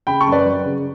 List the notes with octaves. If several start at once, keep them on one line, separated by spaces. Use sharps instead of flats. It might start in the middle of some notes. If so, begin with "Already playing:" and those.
C#3 G5 B5
A5 C#6
F#2
B4 D5
F#3
C#3